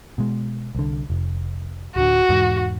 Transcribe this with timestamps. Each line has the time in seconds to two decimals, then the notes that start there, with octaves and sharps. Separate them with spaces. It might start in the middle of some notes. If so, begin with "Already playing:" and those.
0.18 B2 G#3
0.75 C2 D3
1.10 F1
1.96 D1 D3 F#4
2.29 E2 G#2 B2